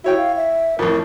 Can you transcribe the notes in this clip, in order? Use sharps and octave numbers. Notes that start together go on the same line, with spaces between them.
E4 F#4 C#5 G5
F5
E5
A1 F2 A#4